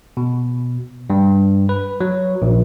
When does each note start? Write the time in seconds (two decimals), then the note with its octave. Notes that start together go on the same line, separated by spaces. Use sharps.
0.17 B2
1.10 G2
1.69 B4
2.01 F#3
2.42 A#1